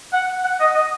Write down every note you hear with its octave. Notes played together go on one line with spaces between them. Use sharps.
F#5
F#5
D#5
D#5